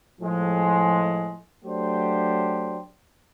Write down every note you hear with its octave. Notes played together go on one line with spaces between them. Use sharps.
A2 F3 G#3
F#3 A3 D4 G4 C5